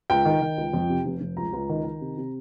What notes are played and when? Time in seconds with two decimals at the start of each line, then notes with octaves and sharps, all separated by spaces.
0.10 C#2 G5
0.25 D#3
0.42 D#3
0.58 C#2
0.73 F2
0.90 C3
1.05 F1
1.21 F1
1.37 C#2 A#5
1.53 C#2
1.69 D#3
1.85 D#3
2.01 C3
2.18 C3